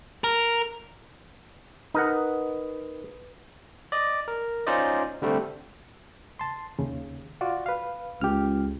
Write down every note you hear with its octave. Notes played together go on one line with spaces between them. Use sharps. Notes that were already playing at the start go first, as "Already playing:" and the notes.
A#4
D#4 A#4 B4 F#5 D#6 F#6
D5 D#5
A#4
C#4 D#4 F4 C5 D5 D#5
D3 G3 A3 C4
A5 C6
D#2 C#3
F4 F#4 D5
B4 F5
C#2 G4 F6